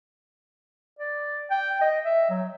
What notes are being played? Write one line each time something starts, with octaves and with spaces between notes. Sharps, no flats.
D5
G5
D#5
E5
F#3